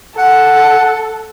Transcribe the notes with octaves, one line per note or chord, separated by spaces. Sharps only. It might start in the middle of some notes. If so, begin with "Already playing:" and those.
A4 F#5